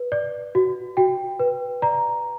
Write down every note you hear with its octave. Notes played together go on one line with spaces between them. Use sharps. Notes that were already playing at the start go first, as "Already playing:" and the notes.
Already playing: B4
D5
F#4
F#4 G5
B4
D5 A#5